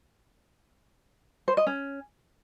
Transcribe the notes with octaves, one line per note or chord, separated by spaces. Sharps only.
C5
D#5
C#4